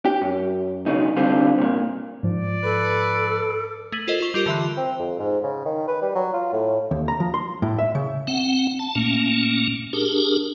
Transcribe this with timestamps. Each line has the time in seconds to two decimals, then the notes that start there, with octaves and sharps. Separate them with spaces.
0.05 G4
0.21 F#2
0.86 B1 C#3 D#4
1.16 C2 D3 G3 C4 F4
1.58 C2 A#2
2.23 G#2 F3 D5
2.64 A4 B4
3.92 A3 G#6 B6 D#7 F#7
4.08 F4 A4 A#4 C5 D#5
4.20 F4 C#6 G7
4.34 G3 F4 G4 A#4
4.46 D3 E3 E5 C6 F#6
4.77 C4
5.00 F2
5.19 G#2
5.43 C#3
5.66 D#3
5.88 B4
6.02 G3
6.15 F#3
6.33 F4
6.53 A2
6.91 D#2
7.08 A#5
7.20 F3
7.34 C6
7.62 A2
7.79 E5
7.95 C#3
8.27 C4 F#5
8.79 A5
8.95 A#2 A3 A#3 C#4
9.93 D4 G4 G#4 A#4